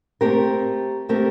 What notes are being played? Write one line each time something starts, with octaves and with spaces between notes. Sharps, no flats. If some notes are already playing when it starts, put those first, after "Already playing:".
A3 C4 G4 A#4
A3 C4 G4 A#4